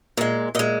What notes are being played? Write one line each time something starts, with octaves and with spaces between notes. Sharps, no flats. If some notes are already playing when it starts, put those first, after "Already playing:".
A#2 G#3
A#2 G#3 D#5